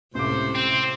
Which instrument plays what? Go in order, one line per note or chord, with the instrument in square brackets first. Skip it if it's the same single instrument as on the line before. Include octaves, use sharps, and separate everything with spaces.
[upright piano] C#2 D6 [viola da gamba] A2 C3 A4 [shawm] C5
[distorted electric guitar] C4 [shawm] C5